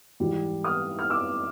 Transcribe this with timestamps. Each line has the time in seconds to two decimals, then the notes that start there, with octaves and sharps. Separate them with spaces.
0.20 G#2 E3 G3
0.64 D#6 F6
0.99 F6
1.10 D6 E6